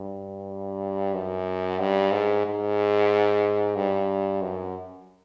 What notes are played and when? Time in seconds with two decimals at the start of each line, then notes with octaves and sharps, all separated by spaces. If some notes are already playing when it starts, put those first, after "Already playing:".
Already playing: G2
1.14 F#2
1.80 G2
2.12 G#2
2.46 G#2
3.76 G2
4.42 F#2